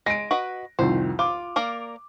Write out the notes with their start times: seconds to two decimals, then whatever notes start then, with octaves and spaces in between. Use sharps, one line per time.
0.06 G#3 A#6 D7
0.31 F#4 B4 D#5
0.79 C2 F2 D#3 C5
1.19 F4 D6
1.56 A#3 A#4 D5